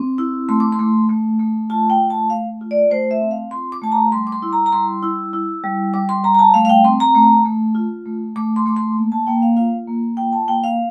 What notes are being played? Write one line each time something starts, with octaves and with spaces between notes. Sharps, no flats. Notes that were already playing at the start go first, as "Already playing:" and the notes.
Already playing: C4
E4
A3 C6
D6
C6
A3
A3
A3
F4 A5
G5
A3
A5
A3 F5
F4
D5
A3 C5
E5
C4
F5
F4 C6
D6
A3 A5
A#5
G3 C6
D6
C6
E4
A#5
A#5
G3 C6
E4
E4
G3
G3 D6
C6
G3 A#5
A#5
A5
A3 F5
F5
G5
C4 C6
A#5
A3
A3
F4
A3
A3 D6
C6
A3 D6
C6
A#3
A5
A#3 G5
F5
F4 F5
A#3
F4 G5
A5
A#3 G5
F5